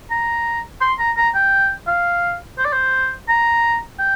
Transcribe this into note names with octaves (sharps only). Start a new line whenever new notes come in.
A#5
C6
A#5
A#5
G5
F5
C5
D5
C5
A#5
G5